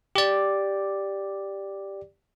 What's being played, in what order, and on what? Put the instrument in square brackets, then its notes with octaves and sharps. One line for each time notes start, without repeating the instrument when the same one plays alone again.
[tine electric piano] G4 D5